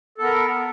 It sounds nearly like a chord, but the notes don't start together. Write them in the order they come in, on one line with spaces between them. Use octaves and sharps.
A4 B3 A#4